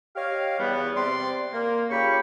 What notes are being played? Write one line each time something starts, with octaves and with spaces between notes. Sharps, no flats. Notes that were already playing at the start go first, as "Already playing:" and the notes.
G4 C#5 D#5 F5
E2 G3 B3
C3 C4 D5 C6
A#3
C#3 F4 G4 G5 B5 C#6